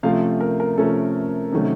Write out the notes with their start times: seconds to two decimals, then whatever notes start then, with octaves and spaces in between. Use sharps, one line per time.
0.03 C3 F3 A3 C#4 F5
0.41 A#4
0.60 A#4
0.78 C3 F3 A3 C#4 A4
1.52 C3 D#3 F#3 A3 C#4